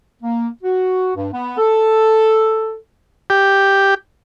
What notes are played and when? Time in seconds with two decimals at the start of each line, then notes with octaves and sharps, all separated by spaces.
0.23 A#3
0.63 F#4
1.15 G2
1.33 B3
1.58 A4
3.30 G4